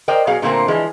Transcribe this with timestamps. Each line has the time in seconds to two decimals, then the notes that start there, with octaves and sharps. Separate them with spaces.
0.08 A#4 C5 D5 D#5 G5
0.27 B2 F#3 G#4 F5
0.42 A#2 D3 A3 A#3 C4
0.68 E3 F3 G#3